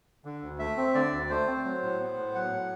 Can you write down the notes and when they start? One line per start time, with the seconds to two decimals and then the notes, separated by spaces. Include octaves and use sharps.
0.25 D3
0.42 D2
0.59 A3 E5
0.77 C4
0.95 D3 D5
1.12 D2
1.30 A3 C5
1.48 C4
1.65 F#3
1.83 A2
2.00 B3
2.17 A2
2.35 F#3 F#5
2.53 A2